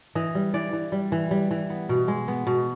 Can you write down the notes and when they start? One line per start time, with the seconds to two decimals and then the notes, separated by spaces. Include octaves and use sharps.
0.15 E3 D#5
0.35 G3
0.54 E3 D5
0.73 E3
0.92 G3
1.12 E3
1.31 G3
1.51 E3
1.70 B3
1.89 B2
2.08 G#3
2.28 B3
2.47 B2